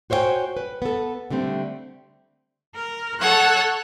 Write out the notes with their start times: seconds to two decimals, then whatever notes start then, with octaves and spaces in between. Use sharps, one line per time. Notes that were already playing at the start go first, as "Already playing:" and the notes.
0.10 F#4 C5 C#5 E5 G5 G#5
0.57 B4
0.82 B3 A4
1.31 D3 G3 A3 C4
2.73 A#4
3.20 A4 C#5 F#5 F#6